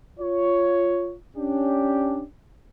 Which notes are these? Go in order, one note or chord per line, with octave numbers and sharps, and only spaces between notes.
F4 C#5
C#4 D4 G4